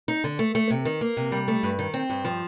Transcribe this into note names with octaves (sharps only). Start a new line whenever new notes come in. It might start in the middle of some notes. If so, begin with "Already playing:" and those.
D#4
D3
A3
A3
C3
D#3
A#3
C3
G3
A3
G2
D#3
C4
G2
F3